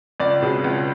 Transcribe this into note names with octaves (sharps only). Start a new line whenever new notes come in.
C#2 D5
B2 G#3 C#4
C#2